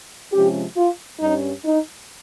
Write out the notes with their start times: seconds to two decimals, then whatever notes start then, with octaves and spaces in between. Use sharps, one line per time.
0.32 C3 F3 G#3 C#4 G4
0.76 F4
1.20 G2 G3 C#4 D#4
1.65 D#4